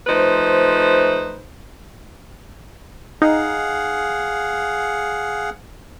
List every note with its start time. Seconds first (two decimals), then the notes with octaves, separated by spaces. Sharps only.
0.07 F3 A3 D#4 B4 C5
3.22 D#4 G#4 F5 F#5